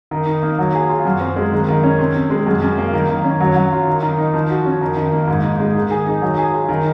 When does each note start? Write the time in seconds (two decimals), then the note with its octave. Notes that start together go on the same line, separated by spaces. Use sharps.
0.11 D#3
0.27 D#4
0.43 A#3
0.58 F#3
0.75 G#4
0.89 F4
1.05 F#2
1.20 C4
1.36 G#3
1.53 D#3
1.68 D#3
1.84 C#4
1.99 C3
2.15 C3
2.30 G#3
2.46 F#2
2.62 F#2
2.78 A#3
2.93 D#3
3.09 D#3
3.24 C#4
3.40 F#3
3.55 F#3
3.72 F4
3.88 D#3
4.03 D#3
4.19 D#4
4.34 F3
4.50 F#4
4.66 C#4
4.81 D#3
4.97 D#3
5.13 A#3
5.28 G#2
5.44 D#4
5.59 G#3
5.75 D#3
5.91 G#4
6.07 D#4
6.22 F#3
6.38 G#4
6.53 F4
6.69 D#3